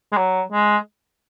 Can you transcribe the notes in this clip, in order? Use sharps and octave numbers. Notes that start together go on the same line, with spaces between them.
G#3
F#3
G#3